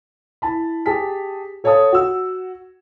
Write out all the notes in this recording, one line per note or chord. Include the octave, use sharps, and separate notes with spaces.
E4 A5 B5
G4 G#4 A5 B6
A4 C#5 F5 A5 D#6
F#4 E6